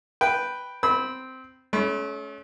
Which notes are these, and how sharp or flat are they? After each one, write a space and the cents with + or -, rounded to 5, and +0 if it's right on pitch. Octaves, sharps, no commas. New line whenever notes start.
B4 +0 G5 +0
C4 -10 B5 +0 E6 -30
A3 -40 C#4 +15 B5 +10